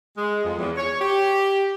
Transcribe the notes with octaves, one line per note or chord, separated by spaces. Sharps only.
G#3
F2
E2
C#5
G4